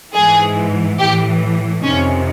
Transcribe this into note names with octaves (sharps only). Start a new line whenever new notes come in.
G#2 E3 G#4
A2 E3 G4
F2 C3 D#3 C#4